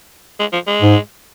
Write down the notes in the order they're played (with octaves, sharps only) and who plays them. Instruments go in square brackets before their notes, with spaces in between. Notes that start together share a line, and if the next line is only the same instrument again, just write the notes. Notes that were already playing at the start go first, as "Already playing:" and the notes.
[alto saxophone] G#3
F3
G#3
[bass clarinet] G#2